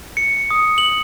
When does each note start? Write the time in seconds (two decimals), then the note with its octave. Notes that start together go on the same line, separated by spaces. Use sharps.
0.17 C#7
0.51 D#6
0.78 F#7